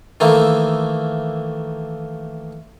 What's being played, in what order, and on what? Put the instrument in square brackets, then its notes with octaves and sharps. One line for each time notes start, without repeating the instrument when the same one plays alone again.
[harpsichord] D#3 E3 A3 A#3